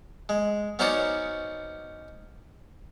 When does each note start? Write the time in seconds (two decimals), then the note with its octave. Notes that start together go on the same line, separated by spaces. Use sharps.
0.29 G#3
0.79 B3 C#4 D#4 F#4 C5 D5